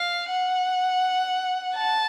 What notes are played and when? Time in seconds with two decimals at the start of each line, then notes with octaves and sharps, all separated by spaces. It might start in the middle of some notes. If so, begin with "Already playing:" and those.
Already playing: F5
0.30 F#5
1.76 A5